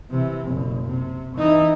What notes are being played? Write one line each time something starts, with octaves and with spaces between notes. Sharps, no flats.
C3 E3
F#1 B2
C3
E3 D#4